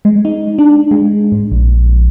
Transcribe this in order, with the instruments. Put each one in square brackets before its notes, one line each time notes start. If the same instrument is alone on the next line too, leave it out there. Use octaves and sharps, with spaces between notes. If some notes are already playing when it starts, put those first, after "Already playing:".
[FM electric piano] G#3
D#4
D4
G#3
G#2
A#1